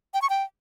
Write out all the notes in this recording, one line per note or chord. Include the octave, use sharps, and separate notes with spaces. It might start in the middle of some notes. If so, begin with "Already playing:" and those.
G5
C#6
G5